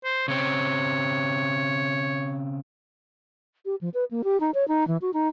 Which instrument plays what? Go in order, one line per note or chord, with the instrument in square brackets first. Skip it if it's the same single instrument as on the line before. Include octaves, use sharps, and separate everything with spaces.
[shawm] C5
[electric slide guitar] C#3 C4 [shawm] C#5
[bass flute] G4
F3
B4
A#3
G4
D#4
C#5
D#4
E3
F#4
D#4